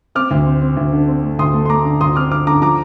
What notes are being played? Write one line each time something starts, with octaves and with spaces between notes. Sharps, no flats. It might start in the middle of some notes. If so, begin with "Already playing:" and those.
C4 D6 F6
D2
C4
C4
D2
D3
C4
A3
D2 C6 D#6
A3
C6
A3 A#5 D6
D3
D2 C6 D#6
C4 D6 F6
D3 D6 F6
D3 A#5 D6
F3 A#5 D6